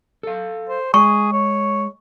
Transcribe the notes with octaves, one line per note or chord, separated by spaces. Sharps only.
A4 F5
C5
G#3 G#4 C#6
C#5